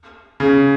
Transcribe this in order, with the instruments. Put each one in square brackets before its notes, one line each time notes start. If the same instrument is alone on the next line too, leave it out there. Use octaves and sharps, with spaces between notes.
[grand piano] C#3